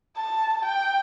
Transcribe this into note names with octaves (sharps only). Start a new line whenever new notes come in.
A5
G5